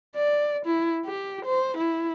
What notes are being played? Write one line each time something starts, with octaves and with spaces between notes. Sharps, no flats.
D5
E4
G4
C5
E4